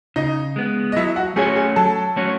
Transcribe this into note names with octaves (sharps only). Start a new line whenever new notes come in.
C#3 D#4 D#5
G#3 B3
D#5
F#3 E4 E5
F#4 F#5
A3 C#4 F#4 G#4 C#5 G#5
G#4 G#5
F#3 A4 A5
A3 C#4 F#4 C#5